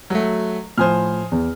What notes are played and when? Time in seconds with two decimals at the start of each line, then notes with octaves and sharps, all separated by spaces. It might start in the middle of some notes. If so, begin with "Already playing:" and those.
0.10 F#3 A3 F#4
0.78 A2 F3 C5 G#5 D#6 F6
1.32 E2